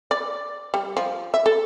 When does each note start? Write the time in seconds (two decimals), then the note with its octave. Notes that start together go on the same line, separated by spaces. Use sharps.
0.11 D5
0.74 G3
0.97 F3
1.34 E5
1.46 A4